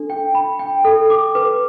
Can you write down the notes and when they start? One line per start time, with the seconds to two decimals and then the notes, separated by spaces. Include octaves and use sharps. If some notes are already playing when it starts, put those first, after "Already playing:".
Already playing: D4 A4
0.10 G5
0.35 B5
0.59 G5
0.85 A4
1.10 D6
1.35 B4